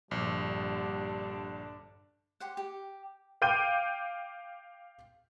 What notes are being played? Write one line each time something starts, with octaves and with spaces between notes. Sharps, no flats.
A#1 G2 D3 G3 D4
G4 C5 F#5
G4
F5 G5 D6 G6 D#7